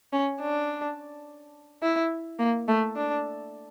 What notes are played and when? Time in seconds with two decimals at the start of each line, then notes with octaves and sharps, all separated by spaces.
0.13 C#4
0.41 D4
1.82 E4
2.39 A#3
2.68 A3
2.96 D4